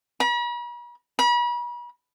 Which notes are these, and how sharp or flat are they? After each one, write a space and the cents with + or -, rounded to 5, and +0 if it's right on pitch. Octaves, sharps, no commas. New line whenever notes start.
B5 -45
B5 -40